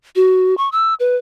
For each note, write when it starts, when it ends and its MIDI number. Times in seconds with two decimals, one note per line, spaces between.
0.16 0.57 66
0.57 0.69 85
0.72 0.94 88
1.00 1.16 71